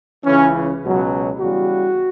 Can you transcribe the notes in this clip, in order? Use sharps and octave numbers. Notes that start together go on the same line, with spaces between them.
C#2 C#3 E3 C#4
C#2 B2 F#3
E2 C#3 G3 F#4